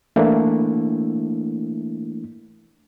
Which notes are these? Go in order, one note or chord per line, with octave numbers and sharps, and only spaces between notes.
E3 A3 A#3 D4 E4